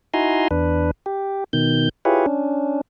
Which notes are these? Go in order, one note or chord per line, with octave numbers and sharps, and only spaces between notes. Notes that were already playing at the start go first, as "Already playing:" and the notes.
D#4 E4 F#4 G#5 A#5 C6
E2 D4 B4
G4
B2 D#3 G6
E4 F4 G4 G#4 B4 C#5
C#4 D4